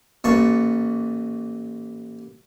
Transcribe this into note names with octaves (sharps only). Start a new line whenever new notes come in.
A1 A#2 A5 C#6